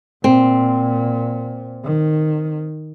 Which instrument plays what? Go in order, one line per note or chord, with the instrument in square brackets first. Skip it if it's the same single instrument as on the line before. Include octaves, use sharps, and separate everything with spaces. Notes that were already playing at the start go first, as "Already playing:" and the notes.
[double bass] A#2 [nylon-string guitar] C4
[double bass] D#3